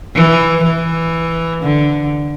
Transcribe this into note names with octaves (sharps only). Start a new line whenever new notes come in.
E3
E3
D3